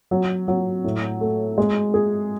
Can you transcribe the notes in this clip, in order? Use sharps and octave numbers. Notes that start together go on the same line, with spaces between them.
F#3
F#3
A2
A3
G#3
G#4